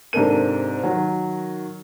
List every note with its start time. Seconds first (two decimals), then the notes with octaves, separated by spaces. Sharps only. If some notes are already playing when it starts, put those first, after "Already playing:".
0.13 G#2 C3 D4 A4 A#4 D#7
0.83 D#3 F#3